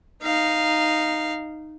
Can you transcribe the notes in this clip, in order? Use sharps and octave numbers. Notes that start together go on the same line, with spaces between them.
D#4 F5